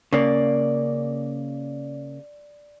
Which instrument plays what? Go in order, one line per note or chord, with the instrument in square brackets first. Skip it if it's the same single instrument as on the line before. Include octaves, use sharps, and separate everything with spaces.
[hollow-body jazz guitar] C#3 A#3 [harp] D5